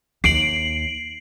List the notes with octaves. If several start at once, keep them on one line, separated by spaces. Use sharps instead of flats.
D#2 C7 D7 F#7